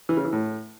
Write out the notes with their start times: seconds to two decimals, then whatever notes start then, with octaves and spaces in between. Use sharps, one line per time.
0.09 E3
0.17 C#3
0.25 E3
0.33 A2